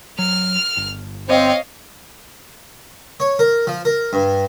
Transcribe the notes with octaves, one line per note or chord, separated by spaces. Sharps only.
F#3 F6 F7
G1
C4 C#5 D#5 F5
C#5
A#4
F3
A#4
G2